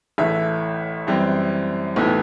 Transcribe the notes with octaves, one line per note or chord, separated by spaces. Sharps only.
A1 A2 E3 A3 E5
F#2 E3 G3 C4
B1 A2 E3 B3